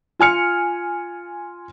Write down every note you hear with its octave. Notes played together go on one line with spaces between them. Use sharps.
F4 G#5 F6 C#7